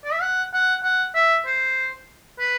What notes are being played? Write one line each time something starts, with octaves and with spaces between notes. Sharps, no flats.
D5
E5
F#5
F#5
F#5
E5
C5
B4